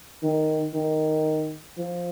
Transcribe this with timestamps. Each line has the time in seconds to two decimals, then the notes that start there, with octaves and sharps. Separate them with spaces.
0.23 D#3
0.74 D#3
1.78 F3